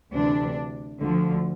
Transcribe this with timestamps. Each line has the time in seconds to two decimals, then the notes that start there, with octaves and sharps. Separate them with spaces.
0.13 D2 C3 E3 D4
1.00 D2 D3 F3